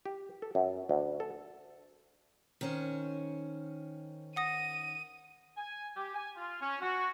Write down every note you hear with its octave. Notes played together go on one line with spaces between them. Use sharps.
G4
A4
F#2
D2
A4
D#3 C#4 C5
F#5 D#6 A#6 D#7
G#5
G4
G#5
F4
C#4
F#4